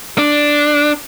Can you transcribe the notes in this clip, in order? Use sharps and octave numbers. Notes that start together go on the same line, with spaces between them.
D4